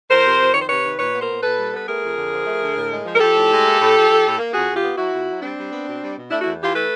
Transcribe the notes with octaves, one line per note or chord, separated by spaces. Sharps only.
F2 A#4 C5
C3
F2
D#3 C#5
C5
C3 B4 C#5
D#3
A#2 B4 C#5
B3
A#4 C5
A#2
A#2 A4 B4
G3
B3 B4
A3 G#4 A#4
F2
D3
F3
A3
D3
A2
G#3
F3
A#4
F3 G4 A4
A2
G#3
A#3
A2
F3
F3
A2
A#3
F2 F#4 G#4
F2
F4 G4
B3
F#3 E4 F#4
F2
F#3
G3 C4 D4
G3
B3
B2
G3
B2
A3 D4 E4
E2 E4 F#4
E3 F4 G4
A3 A4 B4